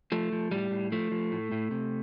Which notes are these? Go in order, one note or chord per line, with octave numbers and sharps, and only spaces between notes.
F3 A3
F3
A2 G3
A2
F3 A3
F3
A2
A2
C3